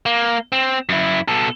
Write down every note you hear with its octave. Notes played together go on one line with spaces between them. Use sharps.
A#3
C4
F#2 E4
B2 A4